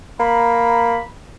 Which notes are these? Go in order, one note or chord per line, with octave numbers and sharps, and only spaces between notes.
A#3 A#5 B5